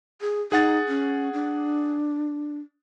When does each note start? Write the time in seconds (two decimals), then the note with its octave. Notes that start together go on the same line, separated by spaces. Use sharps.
0.21 G#4
0.52 D#4 G#4 F#5 A6
0.88 C#4
1.33 D4